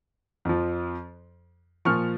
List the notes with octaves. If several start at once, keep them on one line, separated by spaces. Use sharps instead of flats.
F2 F3
A#2 F3 C#6 F6